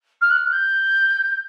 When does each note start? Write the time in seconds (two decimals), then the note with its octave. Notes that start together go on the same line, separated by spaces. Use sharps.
0.21 F6
0.30 F#6
0.37 F6
0.46 F#6
0.52 G6